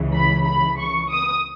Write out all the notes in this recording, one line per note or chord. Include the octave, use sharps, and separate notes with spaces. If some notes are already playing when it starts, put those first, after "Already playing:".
Already playing: C#2 C#3 E3
B5
B5
C#6
D#6